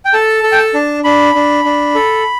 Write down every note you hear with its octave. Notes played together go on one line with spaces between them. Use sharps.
G5
A4 A5
A4
G5
A5
D4
D4 B5
D4
D4
A4